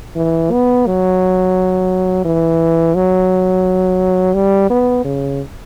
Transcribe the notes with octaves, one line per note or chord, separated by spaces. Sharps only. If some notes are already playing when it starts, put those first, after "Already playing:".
E3
B3
F#3
E3
F#3
G3
B3
C#3